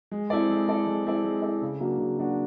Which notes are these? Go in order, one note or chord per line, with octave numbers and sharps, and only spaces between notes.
G#3
C4 E4 A4 D5
G#3
C4 E4 A4 D5
G#3
C4 E4 A4 D5
G#3
C4 E4 A4 D5
C#3
F#3 A#3 D4 F#4
C#3
F#3 A#3 D4 F#4